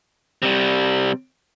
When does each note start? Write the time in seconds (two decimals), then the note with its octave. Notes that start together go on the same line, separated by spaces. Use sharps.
0.42 C3 G3